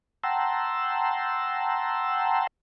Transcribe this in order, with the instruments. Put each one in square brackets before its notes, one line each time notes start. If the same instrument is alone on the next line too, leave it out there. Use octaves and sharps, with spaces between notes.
[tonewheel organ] F#5 G5 A5 A#5 C6 E6